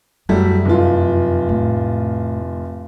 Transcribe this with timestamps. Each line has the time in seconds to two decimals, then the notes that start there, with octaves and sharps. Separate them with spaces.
0.29 F#2 F#3 G3 A3
0.65 F1 F4
1.49 A2